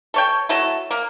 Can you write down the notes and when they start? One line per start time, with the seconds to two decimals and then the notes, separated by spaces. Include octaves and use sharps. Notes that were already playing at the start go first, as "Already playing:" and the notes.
0.14 A4 C#5 G5
0.49 F#3 A3 E4 A4
0.91 A#3